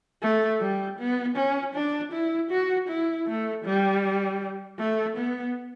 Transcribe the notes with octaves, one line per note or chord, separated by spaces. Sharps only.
A3
G3
B3
C#4
D4
E4
F#4
E4
A3
G3
A3
B3